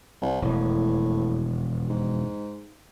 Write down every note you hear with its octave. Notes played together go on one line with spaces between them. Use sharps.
C2
E1 F2 A2
G#2